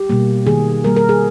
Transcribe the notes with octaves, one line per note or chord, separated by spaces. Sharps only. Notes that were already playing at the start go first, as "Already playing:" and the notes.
Already playing: G4
B2 G3 A#3
D#3 A#3 G#4
D#3 G3 A#3 A#4
A#4
G#4